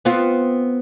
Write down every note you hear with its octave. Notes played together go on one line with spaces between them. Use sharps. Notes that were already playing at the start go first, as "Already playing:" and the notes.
B3 C4 F4